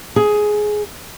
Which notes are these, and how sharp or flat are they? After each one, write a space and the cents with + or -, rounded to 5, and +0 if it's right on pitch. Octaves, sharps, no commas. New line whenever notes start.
G#4 +10